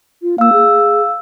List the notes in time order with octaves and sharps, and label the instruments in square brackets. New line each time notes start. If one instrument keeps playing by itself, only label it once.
[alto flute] F4
[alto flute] A#3 [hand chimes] F5 E6
[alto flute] G#4